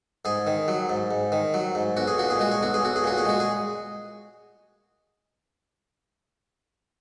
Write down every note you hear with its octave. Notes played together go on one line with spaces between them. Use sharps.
G#2 G#4
D#3
F#3
G#2
G#2
D#3
F#3
G#2
B1 F#4
G#4
A#2 F#4
G#4
G#3 F#4
G#4
B1 F#4
G#4
B1 F#4
G#4
A#2 F#4
G#4
G#3 F#4
G#4